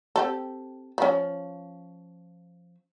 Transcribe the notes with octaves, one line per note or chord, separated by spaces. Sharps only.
C4 G4 A4
F3 C#4